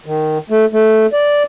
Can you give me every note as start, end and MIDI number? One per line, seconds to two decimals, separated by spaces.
0.06 0.38 51
0.50 0.66 57
0.72 1.06 57
1.13 1.43 74